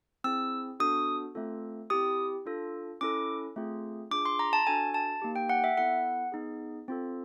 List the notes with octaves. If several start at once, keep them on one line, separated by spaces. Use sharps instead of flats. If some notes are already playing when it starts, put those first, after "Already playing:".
C4 E4 G#4 E6
B3 D4 F#4 A4 D#6
A3 C4 F4 A4
C4 E4 G4 D#6
D4 F4 A4
C#4 E4 A4 D6
A3 C4 F4 G#4
D4 F4 G#4 D6
C6
A#5
A5
D4 F#4 A4 G#5
A5
A#3 D#4 G4
G5
F#5
E5
B3 E4 A4 F#5
B3 D#4 G#4
C4 F4 A4